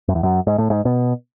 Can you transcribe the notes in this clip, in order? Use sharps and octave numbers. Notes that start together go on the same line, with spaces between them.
F#2
E2
F#2
G#2
A2
G#2
B2